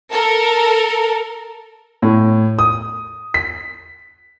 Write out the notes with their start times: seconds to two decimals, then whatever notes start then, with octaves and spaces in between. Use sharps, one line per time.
0.12 A4 A#4
2.02 A2
2.59 D#6
3.34 B6